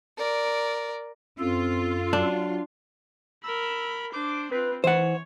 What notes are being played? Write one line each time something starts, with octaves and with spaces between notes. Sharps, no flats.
A#4 D5
F#2 C4 F4 A4
F#3 D4
A#4 B5 E6
D4 C5 D6
C4 F4 B4
E3 C5 C#5 F#5